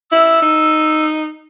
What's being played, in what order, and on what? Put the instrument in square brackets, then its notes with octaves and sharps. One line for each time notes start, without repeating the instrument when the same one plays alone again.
[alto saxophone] E4 [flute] E6
[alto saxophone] D#4